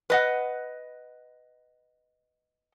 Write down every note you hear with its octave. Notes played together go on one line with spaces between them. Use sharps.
B4 D#5 F#5